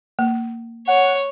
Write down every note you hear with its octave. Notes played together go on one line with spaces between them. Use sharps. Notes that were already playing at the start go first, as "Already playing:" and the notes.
A#3
C#5 F#5